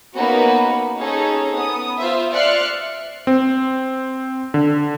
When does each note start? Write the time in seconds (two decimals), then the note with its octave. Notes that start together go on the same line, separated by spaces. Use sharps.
0.17 A#3 B3 C#4 D#4 F#4 B4
1.00 C#4 D#4 G#4 A4 C#5
1.55 B3 D#6
1.99 F4 C5 E5
2.33 D5 E5 F6 F#6 C7 C#7
3.27 C4
4.54 D3